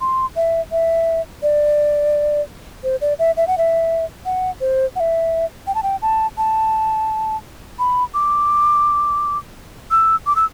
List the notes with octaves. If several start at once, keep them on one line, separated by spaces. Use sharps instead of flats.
C6
E5
E5
D5
C5
D5
E5
E5
F#5
E5
F#5
C5
F#5
E5
G5
A5
G5
A5
A5
B5
D6
E6
D6
E6